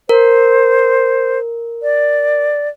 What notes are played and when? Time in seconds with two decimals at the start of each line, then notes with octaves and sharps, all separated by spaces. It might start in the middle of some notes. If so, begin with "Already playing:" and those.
0.09 A#4 C5
1.83 D5